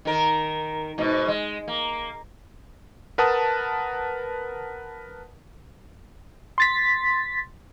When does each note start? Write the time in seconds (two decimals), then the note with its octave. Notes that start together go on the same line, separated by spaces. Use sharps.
0.05 D#3 A#4
0.98 G#2 B2
1.28 G#3
1.68 A#3
3.18 A#4 B4 F#5 A5 D#6
6.58 C6 A6 B6